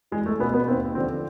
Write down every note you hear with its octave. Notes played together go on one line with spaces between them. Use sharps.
E2 G#3
A3
B2 B3
B3
D#2 C4
D3 F3 C4